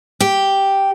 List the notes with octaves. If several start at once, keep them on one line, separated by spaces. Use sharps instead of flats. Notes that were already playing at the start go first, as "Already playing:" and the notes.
G4